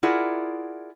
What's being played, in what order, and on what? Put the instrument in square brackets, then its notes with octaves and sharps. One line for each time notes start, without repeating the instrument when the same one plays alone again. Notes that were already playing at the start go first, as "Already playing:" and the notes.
[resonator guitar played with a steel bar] E4 F4 G#4 A#4 D5 F#5